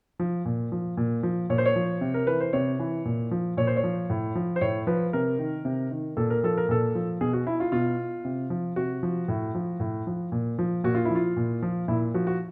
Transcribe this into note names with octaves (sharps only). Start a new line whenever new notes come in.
F3
A#2
F3
A#2
F3
A#2 C#5
C5
C#5
F3
C3
A#4
E3 B4
C5
C3 C#5
E3
A#2
F3
A#2 C#5
C5
C#5
F3
A2
F3
C5
A2 C#5
F3 B4
C3 A#4
D#3
C3
D#3
A#2 A4
A#4
F3 A4
A#4
A#2 A4
F3
B2 G#4
F#4
E4
F4
B2 F4
C3
F3
C3 F#4
F3
A2
F3
A2
F3
A#2
F3
A#2 F#4
F4
F3 E4
F4
A#2
F3
A#2 E4
F3 F#4
F#4